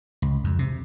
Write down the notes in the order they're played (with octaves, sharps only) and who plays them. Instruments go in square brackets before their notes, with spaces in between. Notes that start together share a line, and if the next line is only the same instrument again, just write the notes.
[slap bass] C#2
F2
C3